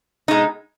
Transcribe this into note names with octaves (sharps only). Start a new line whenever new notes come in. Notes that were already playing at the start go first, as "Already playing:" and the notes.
B2 G#3 D#4